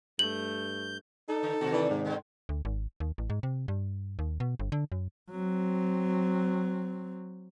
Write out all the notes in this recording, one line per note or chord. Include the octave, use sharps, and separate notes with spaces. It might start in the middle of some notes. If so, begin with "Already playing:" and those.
G2 A3 G6 F#7
D4 D#4 A4
C#3
A2 C3 D#3 F#4
E3 G3 C#4 D5
G#2
B2 D3 G#3
D2
G#1
D#2
A1
G#2
C3
G2
D#2
B2
G1
D3
F#2
F#3 C4